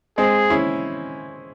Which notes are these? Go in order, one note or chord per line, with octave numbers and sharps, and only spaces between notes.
G#3 C4 G#4
C#4 E4